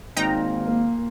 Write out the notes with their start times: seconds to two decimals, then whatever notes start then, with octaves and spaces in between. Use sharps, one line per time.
0.17 G#1 A#2 D#4 G5 A#5
0.63 A#3